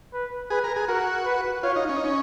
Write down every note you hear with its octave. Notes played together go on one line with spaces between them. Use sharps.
B4
G#4 B4
A#4
G#4
F#4 A#4
B4
F4 C#5
D#4
C#4
D#4
C#4